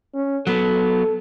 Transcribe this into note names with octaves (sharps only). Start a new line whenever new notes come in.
C#4
F#3 B3 A4